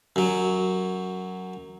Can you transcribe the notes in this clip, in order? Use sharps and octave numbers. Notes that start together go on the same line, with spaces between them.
F#2 F#3